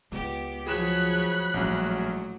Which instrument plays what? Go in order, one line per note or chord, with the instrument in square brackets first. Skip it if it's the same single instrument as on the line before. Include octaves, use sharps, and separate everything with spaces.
[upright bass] C#2 G#3 [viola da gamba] B3 G4
[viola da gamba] F3 F#3 C#5 [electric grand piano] G#4 E7 [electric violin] B5 F#6
[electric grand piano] A#1 C#4 [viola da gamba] A2 F#3 [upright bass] E3 G3